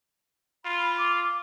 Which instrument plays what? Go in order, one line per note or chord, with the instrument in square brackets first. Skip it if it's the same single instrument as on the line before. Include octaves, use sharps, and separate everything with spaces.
[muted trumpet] F4 [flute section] B5
[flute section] D6